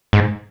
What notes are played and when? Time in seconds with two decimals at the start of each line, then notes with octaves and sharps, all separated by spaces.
0.13 G#2